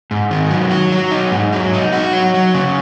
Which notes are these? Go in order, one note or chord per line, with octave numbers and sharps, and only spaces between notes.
G#2
D#3
F#3
F#4
F#3
D#4
G#2
F#3
D#4
F#4
F#3
F#3
C#3